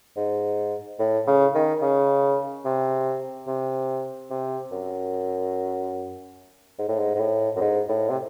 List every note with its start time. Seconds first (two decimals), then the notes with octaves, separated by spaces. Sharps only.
0.17 G#2
0.99 A2
1.27 C#3
1.55 D#3
1.82 C#3
2.65 C3
3.48 C3
4.30 C3
4.72 F#2
6.79 G#2
6.88 A2
6.99 G#2
7.15 G#2
7.20 A2
7.56 F#2
7.61 G#2
7.89 A2
8.10 C3